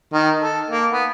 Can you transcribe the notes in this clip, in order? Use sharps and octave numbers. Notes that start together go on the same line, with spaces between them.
D#3
A4
A#3
B3